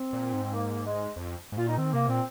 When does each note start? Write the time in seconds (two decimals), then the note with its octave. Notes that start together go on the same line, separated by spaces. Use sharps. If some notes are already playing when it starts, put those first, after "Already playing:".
Already playing: C4
0.13 A#2
0.33 G#2
0.43 C4
0.54 A#3
0.85 G#3
1.16 F2
1.52 G#2
1.57 A#2 F4
1.68 D#4
1.78 D#3 C4
1.93 C3 A#3
2.09 A#2 C4